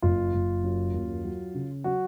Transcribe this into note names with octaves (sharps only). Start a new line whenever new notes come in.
F#1 F4
F#1
F#2
D#2
F#3
C#3
F#3 F#4